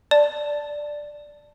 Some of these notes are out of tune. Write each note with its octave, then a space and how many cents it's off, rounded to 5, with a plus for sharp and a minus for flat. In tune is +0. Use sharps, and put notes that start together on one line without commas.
D5 +0 A5 +5